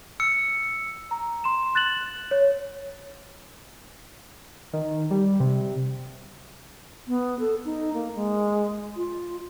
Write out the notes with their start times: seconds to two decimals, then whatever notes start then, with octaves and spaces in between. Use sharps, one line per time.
0.20 E6 C#7
1.11 A#5
1.44 C6 E7
1.75 F#6 A6 E7 F#7
2.31 C#5
4.73 D#3
5.11 G3
5.40 C3
7.08 B3
7.40 A4
7.65 D#4
7.94 A#3
8.15 G#3
8.96 F4